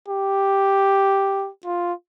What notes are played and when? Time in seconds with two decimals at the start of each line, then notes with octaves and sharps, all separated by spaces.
0.08 G4
1.65 F4